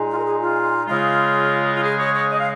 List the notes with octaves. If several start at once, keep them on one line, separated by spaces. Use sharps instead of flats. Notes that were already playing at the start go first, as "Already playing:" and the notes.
Already playing: A#2 G#3 D#4
F4
A#4
G#4
F4
C#3 G#3 F4
F4
G#4
C#5
C#5
D#5
F5